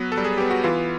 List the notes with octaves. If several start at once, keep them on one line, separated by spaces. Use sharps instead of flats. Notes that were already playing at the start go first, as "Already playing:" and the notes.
Already playing: F#3 B3 B4
A4
G3
G#4
B3 G4
F#4
E3 F4